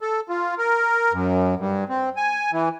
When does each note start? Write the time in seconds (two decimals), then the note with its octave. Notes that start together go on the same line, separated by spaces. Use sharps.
0.01 A4
0.29 F4
0.58 A#4
1.13 F#2
1.59 G2
1.89 C4
2.17 G#5
2.52 E3